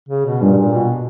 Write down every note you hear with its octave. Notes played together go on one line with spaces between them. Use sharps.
C#3
B2
G2 A#2
A#2
B2